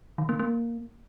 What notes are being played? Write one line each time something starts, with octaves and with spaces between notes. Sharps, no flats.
D#3
A#3
A#3